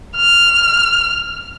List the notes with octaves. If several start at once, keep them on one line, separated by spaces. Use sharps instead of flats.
F6